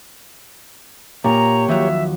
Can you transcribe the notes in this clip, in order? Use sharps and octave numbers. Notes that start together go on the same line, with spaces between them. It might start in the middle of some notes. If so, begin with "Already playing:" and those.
A#2 A#3 G4 C#5 A#5
D#2 F3 F#3 E5